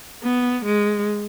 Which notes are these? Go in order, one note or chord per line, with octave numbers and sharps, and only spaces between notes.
B3
G#3